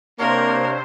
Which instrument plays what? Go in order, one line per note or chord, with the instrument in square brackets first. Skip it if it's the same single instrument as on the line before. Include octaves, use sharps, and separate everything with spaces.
[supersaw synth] C3 C5 [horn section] A#3 [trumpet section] D4 C#5 F5 [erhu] A#4